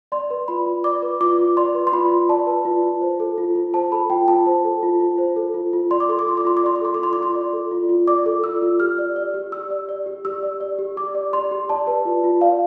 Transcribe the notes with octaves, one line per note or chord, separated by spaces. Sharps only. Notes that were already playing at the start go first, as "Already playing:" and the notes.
D5 C6
B4
F4 B5
F4
D5 D6
B4
F4 D6
F4
D5 C6
B4
C6
F4 B5
F4
D5 A5
B4
F4
F4
C5
A4
F4
F4
C5 A5
A4 B5
F4 G5
F4 A5
C5
A4
F4
F4
C5
A4
F4
F4
D5 C6
D6
A4 C6
D6
F4 C6
D6
F4 C6
D6
D5 C6
D6
A4 C6
D6
F4 C6
D6
F4
C6
D5
A4
F4
F4
D5 D6
A4
F4 E6
F4
G4 F6
D5
D5
G4
G4 E6
D5
D5
G4
G4 E6
D5
D5
G4
G4 D6
D5
D5 C6
G4
D5 A5
B4
F4
F4
D5 F5